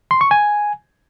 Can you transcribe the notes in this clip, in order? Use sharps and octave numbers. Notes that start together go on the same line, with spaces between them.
C6
C#6
G#5